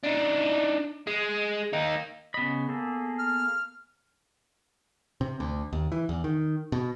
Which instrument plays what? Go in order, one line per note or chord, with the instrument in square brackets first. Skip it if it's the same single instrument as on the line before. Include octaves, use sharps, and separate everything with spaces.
[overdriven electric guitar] D4 D#4
G#3
A#3 D#4
[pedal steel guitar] C#3 D#5 [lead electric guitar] B3 B5
[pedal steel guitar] A#3 G#4 A4
[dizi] F6
[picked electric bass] C3
D2
D#2
E3
E2
D#3
B2